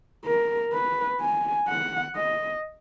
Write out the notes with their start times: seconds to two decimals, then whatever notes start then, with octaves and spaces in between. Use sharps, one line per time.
0.25 A#4
0.73 B4
1.21 G#5
1.68 F#5
2.16 D#5